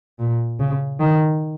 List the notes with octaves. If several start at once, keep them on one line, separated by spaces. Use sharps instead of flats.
A#2
C#3
D#3